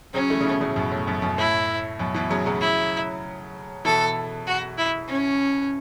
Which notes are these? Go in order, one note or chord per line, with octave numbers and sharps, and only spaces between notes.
C#3 F#3 C#4
E3 A3
C#3
B2 E3
A2 C#3
F#2 B2
A2
F#2 B2
F#2 B2
A2 E4
F#2 B2
B2 E3
C#3 F#3
C#3 F#3
E4
B2 E3 A4
F#4
E4
C#4